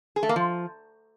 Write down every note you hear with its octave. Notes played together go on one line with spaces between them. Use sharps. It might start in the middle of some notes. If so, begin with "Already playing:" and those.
G#4
A3
A#3
F3